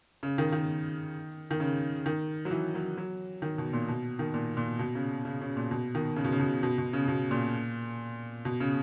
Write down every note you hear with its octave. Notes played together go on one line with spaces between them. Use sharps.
C#3
D#3
D#3
D#3
C#3
D#3
F#3
E3
F#3
F#3
D#3
B2
A#2
B2
D#3
A#2
A#2
B2
C#3
C#3
C#3
A#2
B2
D#3
C#3
B2
C#3
B2
B2
B2
C#3
B2
A#2
B2
C#3